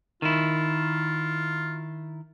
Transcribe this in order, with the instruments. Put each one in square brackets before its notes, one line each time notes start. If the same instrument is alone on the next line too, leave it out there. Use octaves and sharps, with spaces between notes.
[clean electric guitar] D#3 E4 [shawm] F4